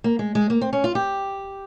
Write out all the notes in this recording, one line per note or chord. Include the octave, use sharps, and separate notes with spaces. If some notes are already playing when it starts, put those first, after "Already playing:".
A#3
G#3
G#3
A#3
C4
C#4
F4
G4